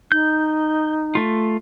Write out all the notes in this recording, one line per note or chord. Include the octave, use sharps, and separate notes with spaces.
D#4 G6
A3 F4